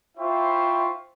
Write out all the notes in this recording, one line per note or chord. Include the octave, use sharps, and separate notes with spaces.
E4 F4 C5 E5 G5 C#6